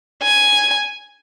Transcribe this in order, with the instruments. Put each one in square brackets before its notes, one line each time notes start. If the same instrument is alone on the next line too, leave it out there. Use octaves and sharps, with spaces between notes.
[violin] G#5